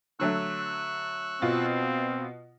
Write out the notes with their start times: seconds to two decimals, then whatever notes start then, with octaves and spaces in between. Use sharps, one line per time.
0.20 D3 F#3 A3 C#6 E6 F#6
1.42 B2 C4 F4